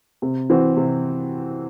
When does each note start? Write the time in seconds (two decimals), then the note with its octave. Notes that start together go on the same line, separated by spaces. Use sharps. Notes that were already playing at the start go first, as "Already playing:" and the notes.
0.22 C3
0.50 E3 C4 F#4
0.77 C3